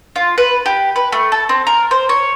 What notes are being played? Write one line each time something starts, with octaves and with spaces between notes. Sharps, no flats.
F4
B4
G4
B4
A3
A4
C4
A#4
C5
C#5